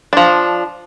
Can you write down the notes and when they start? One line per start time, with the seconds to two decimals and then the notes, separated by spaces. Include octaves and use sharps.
0.13 F3 D4